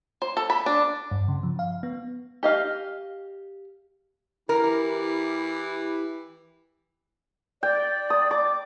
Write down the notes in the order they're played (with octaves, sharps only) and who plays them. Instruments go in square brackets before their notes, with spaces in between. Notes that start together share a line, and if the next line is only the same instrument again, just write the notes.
[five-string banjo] C5
A4
B5
D4
[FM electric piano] G2
C#3
F3
F5
B3
[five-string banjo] G4 D#5 F5
[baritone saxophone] E3 [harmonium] E4 G4 [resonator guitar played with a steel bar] A#4
[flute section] D5 [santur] G5
[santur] D#6
D6